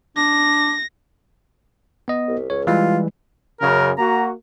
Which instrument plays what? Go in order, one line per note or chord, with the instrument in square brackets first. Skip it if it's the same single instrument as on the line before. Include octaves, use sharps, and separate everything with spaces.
[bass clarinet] D4 [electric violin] A#6
[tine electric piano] B3 D#5
[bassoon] C2
[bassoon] C#2 [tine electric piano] C#5
[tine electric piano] E3 G3 G#3 [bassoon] F4
[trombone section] F#2 C#3 [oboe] A#4
[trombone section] A#3 F#4 [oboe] A#5